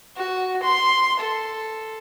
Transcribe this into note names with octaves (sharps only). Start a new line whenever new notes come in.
F#4
C6
A4